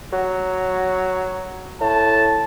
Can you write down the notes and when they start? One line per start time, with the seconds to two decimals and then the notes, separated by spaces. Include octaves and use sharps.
0.13 F#3
1.81 A2 A5